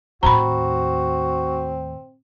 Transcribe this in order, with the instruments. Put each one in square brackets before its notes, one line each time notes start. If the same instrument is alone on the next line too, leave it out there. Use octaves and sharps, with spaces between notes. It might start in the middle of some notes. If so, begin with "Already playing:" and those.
[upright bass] D#2 A2 [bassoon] C4 [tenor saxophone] F#4 [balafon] A#5 B5